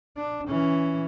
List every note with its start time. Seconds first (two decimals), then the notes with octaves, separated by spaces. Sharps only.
0.17 D4
0.49 E3 C#4